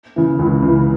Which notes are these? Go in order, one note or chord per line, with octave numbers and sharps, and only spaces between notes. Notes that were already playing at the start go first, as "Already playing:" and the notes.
C#3 E3
C#2
C#3 E3